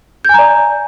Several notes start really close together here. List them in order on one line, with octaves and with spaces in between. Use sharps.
G6 G#5 A#5 D5